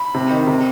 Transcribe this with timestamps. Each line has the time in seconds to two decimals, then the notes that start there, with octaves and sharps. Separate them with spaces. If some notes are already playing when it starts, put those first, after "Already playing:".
Already playing: B5
0.14 C3
0.30 D#3
0.47 C3